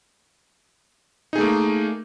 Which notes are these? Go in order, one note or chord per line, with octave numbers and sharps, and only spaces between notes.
A3 A#3 D#4 G#4